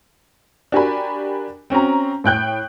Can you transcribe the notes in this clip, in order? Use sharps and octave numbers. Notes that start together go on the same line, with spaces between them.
D4 F#4 G4 A#4 G#5 B5
C4 C#4 F#4 A#5
A2 G5 F#6 G6